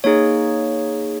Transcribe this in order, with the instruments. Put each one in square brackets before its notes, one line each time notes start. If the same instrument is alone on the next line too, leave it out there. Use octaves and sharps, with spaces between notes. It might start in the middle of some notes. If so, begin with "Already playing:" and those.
[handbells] A#3 D#4 G#4 C#5